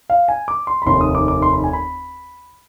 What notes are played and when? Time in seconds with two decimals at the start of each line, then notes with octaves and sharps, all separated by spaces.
0.10 F5
0.28 G#5
0.48 D6
0.67 C6
0.82 B5
0.86 F1 D#2 D#3 C6
1.01 D#6
1.15 D6
1.28 D6
1.42 C6
1.53 B5
1.64 G#5
1.73 B5